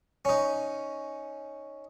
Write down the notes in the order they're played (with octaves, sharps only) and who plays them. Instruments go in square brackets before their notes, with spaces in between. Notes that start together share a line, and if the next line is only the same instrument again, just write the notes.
[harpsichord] C#4 D#4